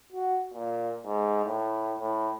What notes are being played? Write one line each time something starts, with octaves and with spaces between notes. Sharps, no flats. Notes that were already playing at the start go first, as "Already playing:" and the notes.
F#4
A#2
G#2
A2
A2